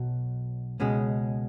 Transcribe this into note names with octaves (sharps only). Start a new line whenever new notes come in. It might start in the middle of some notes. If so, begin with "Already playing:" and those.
Already playing: B1 B2 F#3
C#2 B2 G#3 C#4